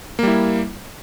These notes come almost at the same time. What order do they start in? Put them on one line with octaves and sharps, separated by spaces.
A#3 G3 E4